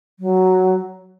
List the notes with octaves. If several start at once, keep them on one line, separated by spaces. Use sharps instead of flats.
F#3